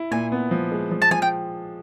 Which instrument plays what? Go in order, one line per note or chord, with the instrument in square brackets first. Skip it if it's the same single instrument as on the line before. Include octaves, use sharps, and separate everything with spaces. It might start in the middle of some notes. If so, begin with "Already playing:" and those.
Already playing: [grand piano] E4
[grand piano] A#2 [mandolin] G#5
[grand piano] B3
F3
G#3
F3
[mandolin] A5
[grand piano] F3 [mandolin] G#5
[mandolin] G5